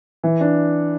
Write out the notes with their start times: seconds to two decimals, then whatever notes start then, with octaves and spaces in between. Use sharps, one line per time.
0.24 E3
0.41 D4